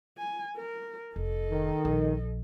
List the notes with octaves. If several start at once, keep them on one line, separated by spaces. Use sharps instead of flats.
G#5
A#4
F1 A4 D#5
D#3
A#1